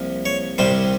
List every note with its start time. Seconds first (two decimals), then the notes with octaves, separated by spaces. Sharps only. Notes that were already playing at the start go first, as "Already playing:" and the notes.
Already playing: C2 C3 F3 A#3
0.25 C#5
0.58 C2 C3 D#3 G3 C5